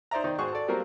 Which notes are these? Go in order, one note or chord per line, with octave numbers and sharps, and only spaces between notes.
D#4 C5 D5 E5 A#5
D#3 D#4 C5 D5
G#2 F#4 G#4 C5 C#6
A4 D5
F#3 G3 A#3 C4 F4 A#4